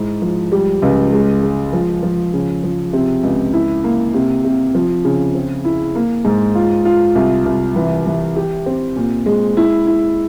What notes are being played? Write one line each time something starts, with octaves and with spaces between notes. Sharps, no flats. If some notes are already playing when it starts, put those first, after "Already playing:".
Already playing: G#2 E4
F3
G3
C#2
G#3
G#3
F3
F3
C#3
F3
C3
C#2
E4
A#3
C3
C3
F3
C#3
C4
E4
A#3
G#2
F4
F4
C2
C2
E3
E3
G4
C4
A#2
G#3
E4
E4